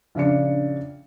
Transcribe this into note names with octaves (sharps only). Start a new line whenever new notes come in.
A#1 C#3 D4 C#7